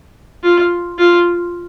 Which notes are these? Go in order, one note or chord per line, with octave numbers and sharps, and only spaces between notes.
F4
F4